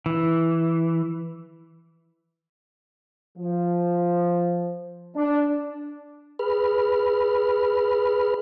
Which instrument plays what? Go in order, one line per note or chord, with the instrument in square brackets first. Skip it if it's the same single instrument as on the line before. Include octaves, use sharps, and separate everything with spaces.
[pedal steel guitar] E3
[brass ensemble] F3
D4
[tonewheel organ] G#4 B4 B5 F6